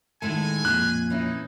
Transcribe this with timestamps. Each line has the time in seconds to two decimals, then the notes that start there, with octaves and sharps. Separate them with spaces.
0.22 A2 D#3 G#3 A3 A4 G#5
0.65 F2 A#2 F#6
1.10 E3 C#4 D#4 E4